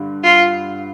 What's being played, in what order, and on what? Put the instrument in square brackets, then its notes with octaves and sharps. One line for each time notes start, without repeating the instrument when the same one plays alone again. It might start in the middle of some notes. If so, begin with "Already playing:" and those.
Already playing: [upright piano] G2 D3
[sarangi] F4